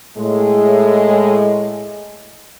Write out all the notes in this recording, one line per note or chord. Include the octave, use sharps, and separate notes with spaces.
A2 G#3